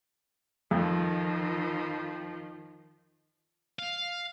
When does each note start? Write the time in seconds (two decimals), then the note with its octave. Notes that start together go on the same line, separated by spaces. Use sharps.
0.71 F2 D#3 F3
3.79 F5